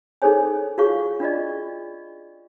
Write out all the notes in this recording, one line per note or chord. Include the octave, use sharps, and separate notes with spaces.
D#4 G#4 A4 C5 C#5 G#5
F4 F#4 G#4 C#5 F5 C#6
D4 F4 D5 D#5